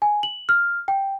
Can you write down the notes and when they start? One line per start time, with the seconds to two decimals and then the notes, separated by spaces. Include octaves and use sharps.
0.02 G#5
0.23 F#7
0.49 F6
0.88 G5